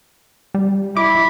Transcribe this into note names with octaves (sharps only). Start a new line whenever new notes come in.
G3
E4 D6